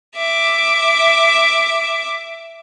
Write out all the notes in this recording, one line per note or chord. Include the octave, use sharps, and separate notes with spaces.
E5 D6